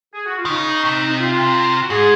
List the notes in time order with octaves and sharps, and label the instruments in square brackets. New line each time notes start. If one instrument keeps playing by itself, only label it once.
[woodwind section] G#4
F#4
F4
[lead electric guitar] D#3
[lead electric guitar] C#3 [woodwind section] D#4
[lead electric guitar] C3
[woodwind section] D#4
F4
F4
F#4
[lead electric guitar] G#2 [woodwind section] G#4